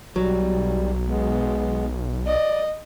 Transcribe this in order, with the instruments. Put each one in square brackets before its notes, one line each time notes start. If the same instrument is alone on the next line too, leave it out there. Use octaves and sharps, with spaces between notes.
[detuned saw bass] B1 [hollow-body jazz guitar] F#3 [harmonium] G3
[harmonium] G#3 B3
[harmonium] D5 [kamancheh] D#5